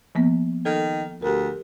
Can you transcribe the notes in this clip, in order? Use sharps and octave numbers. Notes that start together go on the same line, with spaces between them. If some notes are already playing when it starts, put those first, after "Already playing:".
F3 A#3 B3
D#3 A4
D2 G4 A#4